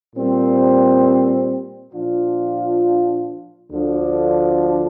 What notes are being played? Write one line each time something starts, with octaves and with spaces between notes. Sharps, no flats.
A#2 G3 C4
A#2 F3 D4 F4
D2 D3 F3 D4